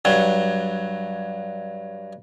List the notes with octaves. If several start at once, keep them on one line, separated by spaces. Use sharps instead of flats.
G2 F#3